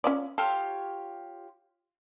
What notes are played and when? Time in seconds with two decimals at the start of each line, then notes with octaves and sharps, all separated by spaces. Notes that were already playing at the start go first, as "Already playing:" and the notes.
0.04 C#4 F4 D5
0.38 F4 G4 A4 C#5